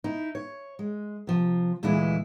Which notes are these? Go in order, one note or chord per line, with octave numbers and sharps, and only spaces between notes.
D#4 E4
C#5
G#3
C3 F3
D2 A#2 E3 G#3 E4